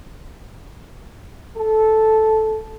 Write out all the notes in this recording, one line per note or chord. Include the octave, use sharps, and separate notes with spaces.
A4